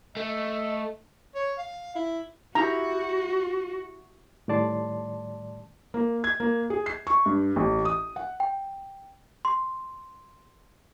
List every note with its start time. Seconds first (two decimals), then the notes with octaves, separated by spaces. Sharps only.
0.17 A3 D#5
1.35 C#5
1.58 F5
1.95 E4
2.55 E4 F#4 G4 A#5
4.48 A2 D#3 G3 D5 A5 C6
5.94 A#3
6.24 G#6
6.40 A#3
6.70 G#4
6.86 C7
7.07 C#6
7.26 G2
7.56 A1
7.85 D#6
8.16 F#5
8.40 G5
9.45 C6